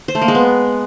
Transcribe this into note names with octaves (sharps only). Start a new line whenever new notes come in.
C5
A3
A#3
G#3
B3